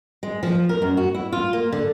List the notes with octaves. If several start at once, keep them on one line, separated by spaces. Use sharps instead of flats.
G#3
F3
A#4
F#2
F#4
E4
F4
A#3
D3